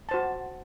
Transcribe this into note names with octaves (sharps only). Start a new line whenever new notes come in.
F#4 C5 A5